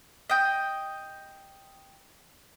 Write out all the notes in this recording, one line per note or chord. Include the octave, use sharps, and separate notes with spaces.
D#5 G5